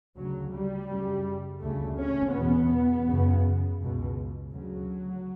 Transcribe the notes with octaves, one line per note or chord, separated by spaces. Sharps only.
D2 C#3 F#3
G3
F#2 C#3
D2 C#3 A3
C#4
E2 B2 B3
F#2 C#3
C#2 B2
D2 C#3 F#3